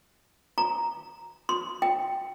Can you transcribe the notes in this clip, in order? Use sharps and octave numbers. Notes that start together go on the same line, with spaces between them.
A#5
C6
G5